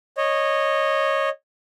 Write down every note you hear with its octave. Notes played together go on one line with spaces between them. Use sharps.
C#5 D#5